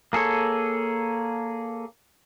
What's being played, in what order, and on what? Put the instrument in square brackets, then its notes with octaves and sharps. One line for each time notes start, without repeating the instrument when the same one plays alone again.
[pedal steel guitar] A#3 G#4 A4 C#5